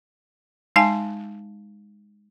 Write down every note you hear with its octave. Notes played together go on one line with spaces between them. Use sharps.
G#3 D#4 F5 G#5 A5